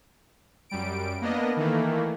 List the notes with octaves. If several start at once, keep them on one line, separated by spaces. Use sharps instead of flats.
F#2 G3 D7
A#3 B3 D4 D#5
D#3 E3 A3 A#3